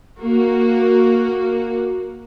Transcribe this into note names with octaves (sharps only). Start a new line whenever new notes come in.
A#3 F#4